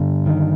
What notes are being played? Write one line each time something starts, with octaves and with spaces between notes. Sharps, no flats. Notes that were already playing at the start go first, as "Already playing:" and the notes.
Already playing: G2 D3
D#3